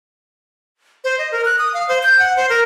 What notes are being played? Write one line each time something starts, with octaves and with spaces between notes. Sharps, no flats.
C5
D#5
A#4
F#6
D#6
F5
C5
G6
F#5
C5
A#4